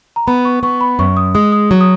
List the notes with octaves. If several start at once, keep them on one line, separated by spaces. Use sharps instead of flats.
A#5
B3 B5
C#6
B3 C#6
B5
F#2 C#6
D#6
G#3 D#6
D#6
F#3
D#6